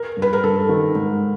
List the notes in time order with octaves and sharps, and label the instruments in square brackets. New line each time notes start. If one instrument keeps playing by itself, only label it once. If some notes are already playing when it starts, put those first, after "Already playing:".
Already playing: [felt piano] A#4
[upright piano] G2
[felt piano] B4
A#4
[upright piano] G2 [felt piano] A4
[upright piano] D#3
G#2